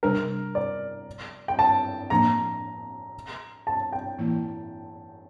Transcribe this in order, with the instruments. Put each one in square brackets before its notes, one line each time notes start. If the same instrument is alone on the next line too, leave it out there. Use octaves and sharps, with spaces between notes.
[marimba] C3 G3 D4 [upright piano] A#4
[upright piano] D5
G5
A5
[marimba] A2 F3 A#3 D4 [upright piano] A#5
[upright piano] A5
G5
[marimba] A2 E3 A#3 E4